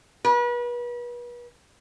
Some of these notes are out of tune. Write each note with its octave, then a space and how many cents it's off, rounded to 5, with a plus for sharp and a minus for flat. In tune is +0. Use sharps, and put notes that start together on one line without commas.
B4 -35